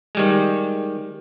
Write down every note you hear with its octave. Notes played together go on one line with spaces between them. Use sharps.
D#3 G3 G#3